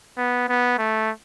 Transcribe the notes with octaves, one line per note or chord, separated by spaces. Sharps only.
B3
B3
A3